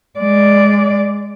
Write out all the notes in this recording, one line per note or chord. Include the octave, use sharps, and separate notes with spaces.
G#3 D5